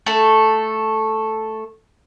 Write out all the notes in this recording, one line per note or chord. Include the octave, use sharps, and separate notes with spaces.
A3 A4